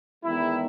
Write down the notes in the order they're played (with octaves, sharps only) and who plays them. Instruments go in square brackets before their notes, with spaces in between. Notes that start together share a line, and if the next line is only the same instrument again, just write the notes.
[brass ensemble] E2 D#3 G#3 E4